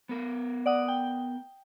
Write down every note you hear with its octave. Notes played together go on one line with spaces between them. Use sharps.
B3 A#4
D5 F#5 D#6
G5